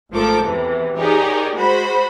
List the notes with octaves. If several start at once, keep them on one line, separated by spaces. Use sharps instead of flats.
G#1 F3 A3 A4 A#4 D6
E2 C3 E3
D#4 G4 G#4 A#4 C#5 D5
G#3 F#4 C5 B5